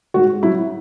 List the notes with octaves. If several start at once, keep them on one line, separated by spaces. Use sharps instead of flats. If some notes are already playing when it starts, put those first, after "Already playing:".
G#2 F#4
F#3 E4